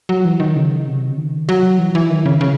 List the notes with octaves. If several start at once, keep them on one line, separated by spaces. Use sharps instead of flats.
F#3
E3
D#3
C#3
C3
C#3
D#3
F#3
E3
E3
D#3
C#3
C#3